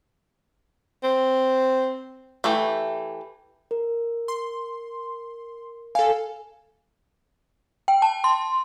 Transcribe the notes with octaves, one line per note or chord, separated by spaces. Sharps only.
C4
E3 A3 G4
A#4
C6
A4 F5 G#5
G5
A5
C6